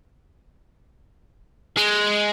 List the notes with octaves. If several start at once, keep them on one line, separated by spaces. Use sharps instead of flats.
G#3